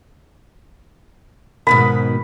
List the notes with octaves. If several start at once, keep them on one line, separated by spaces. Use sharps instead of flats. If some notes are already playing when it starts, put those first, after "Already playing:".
G#2 B2 D#3 B5